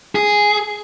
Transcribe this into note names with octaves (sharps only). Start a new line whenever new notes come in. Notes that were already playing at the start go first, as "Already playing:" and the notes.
G#4